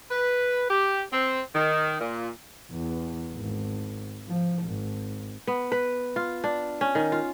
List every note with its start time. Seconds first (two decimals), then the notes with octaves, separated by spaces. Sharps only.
0.11 B4
0.70 G4
1.12 C4
1.54 D#3
2.00 A#2
2.72 E2
3.35 G#1
4.28 F3
4.63 G#1
5.47 B3
5.72 B4
6.16 F4
6.44 D4
6.81 C#4
6.95 D#3
7.12 F4